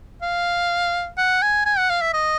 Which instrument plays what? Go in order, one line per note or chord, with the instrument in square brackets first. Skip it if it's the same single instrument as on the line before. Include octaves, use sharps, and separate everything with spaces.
[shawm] F5
F#5
G#5
G#5
F#5
F5
E5
D#5